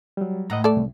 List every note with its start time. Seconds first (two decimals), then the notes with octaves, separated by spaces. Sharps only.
0.17 F#3 G3
0.50 E2 A2 D#5 F#5 A#5
0.64 A3 A4 D5
0.77 C2